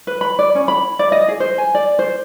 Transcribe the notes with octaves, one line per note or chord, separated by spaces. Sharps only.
B4
B5
D5
C#4
B5
D5
D#5
G#4
C5
G#5
D5
C5